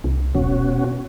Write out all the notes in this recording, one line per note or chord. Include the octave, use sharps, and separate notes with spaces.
C2
E1 B2 C#4 F#4